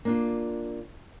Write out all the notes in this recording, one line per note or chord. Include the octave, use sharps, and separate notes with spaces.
A#3 D4 F4